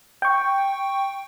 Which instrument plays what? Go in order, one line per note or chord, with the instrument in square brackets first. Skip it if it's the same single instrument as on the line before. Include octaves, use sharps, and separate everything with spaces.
[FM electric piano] G5 C#6